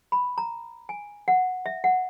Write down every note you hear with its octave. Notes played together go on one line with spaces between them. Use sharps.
B5
A#5
G#5
F#5
E5
F#5